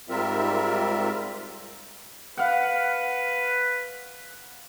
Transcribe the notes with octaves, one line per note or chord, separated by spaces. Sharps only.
G#2 G3 C4 F4 A#4 E5
B4 F5 F#5